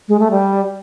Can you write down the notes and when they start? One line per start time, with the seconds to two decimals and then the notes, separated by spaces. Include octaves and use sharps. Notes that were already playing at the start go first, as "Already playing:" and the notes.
0.08 G#3
0.20 A3
0.31 G3